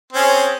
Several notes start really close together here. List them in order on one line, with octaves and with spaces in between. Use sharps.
C4 C#4 G#4